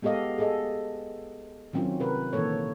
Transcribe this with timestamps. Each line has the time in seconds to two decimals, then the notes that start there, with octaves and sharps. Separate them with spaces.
0.02 G#3 B3 G4 A4 D#5 F5
0.38 G#4 A4 D#5
1.73 D#3 F#3 C4 C#4 F4
2.00 C3 A#4 B4
2.33 A#2 D#3 E3 A#3 A4 C#5